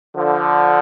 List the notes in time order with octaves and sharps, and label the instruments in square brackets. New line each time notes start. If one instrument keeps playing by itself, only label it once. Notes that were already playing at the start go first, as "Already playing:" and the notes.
[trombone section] D3 F3